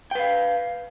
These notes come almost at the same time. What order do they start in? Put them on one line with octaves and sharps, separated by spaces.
G5 B4 F5